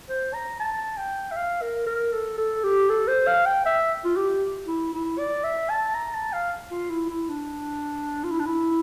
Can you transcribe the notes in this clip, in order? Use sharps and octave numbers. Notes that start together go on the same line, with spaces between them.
C5
A#5
A5
G5
E5
F5
A#4
A#4
A4
A4
G4
A4
C5
F5
G5
E5
F4
G4
E4
E4
D5
E5
A5
A#5
A5
F5
F4
E4
E4
D4
F4
E4
D4
E4